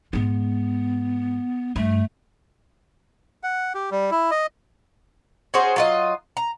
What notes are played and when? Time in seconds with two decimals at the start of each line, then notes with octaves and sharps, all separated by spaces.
0.13 G#2 G#3 B3
1.76 G2 A3
3.43 F#5
3.75 G4
3.91 G3
4.11 E4
4.31 D#5
5.54 C#4 F#4 G#4 C5
5.76 F#3 F4 D#5
6.37 A#5